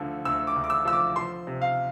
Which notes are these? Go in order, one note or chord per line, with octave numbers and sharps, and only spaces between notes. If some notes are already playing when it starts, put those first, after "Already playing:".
Already playing: D2 D3 F3
D2 E6
D6
D2
D6
E6
F3 E6
D6
F3 C6
C3
F5